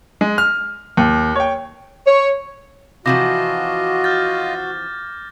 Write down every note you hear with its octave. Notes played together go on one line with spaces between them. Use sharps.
G#3
F6
D#2
C#5 G5
C#5
C3 E3 F3 F4 F#4 D#5 D6 A#6
F6 G6 A6